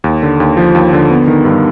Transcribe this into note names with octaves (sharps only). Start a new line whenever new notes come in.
D#2
D3
D#2
F3
D#2
D3
B3
D#3
G2